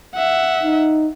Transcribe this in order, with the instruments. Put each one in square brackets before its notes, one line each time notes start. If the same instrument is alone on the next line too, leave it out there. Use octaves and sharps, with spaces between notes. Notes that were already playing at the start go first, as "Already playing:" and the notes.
[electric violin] E5 F#5
[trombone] D#4